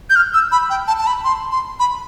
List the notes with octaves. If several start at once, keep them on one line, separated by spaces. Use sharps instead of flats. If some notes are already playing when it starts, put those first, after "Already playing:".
G6
F6
E6
B5
G5
A5
A5
B5
C6
C6
B5